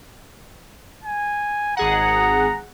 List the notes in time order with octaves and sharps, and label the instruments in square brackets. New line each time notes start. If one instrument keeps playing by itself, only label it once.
[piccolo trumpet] G#5
[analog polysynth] G#1 G#4 F#5 [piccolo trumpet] A#5